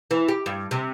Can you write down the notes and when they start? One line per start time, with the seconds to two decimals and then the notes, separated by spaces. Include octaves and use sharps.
0.11 E3
0.28 G4
0.46 G2
0.71 C3